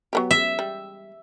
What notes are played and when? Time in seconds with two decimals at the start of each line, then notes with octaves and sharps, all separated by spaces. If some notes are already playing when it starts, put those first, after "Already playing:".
0.13 F#3 B3 G4
0.31 E5
0.59 G3